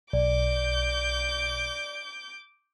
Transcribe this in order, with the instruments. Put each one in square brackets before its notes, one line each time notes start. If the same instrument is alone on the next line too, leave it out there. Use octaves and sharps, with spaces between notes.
[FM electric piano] B1 [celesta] D5 [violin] D6 G6